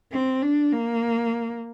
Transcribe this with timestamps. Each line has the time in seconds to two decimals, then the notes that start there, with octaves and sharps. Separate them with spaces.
0.12 C4
0.42 D4
0.72 A#3